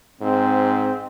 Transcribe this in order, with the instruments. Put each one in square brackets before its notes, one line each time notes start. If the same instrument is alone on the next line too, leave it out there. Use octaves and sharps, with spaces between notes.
[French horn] G#2 [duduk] C4